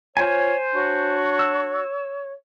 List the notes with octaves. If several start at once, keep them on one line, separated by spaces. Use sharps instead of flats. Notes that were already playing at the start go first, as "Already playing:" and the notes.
F4 C5 C#5 G#5
D4 F#4 C#5
E6